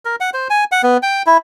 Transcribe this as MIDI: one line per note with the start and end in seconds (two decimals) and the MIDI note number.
0.05 0.16 70
0.20 0.30 78
0.34 0.48 72
0.50 0.64 80
0.72 0.82 78
0.83 0.97 59
1.03 1.22 79
1.26 1.37 64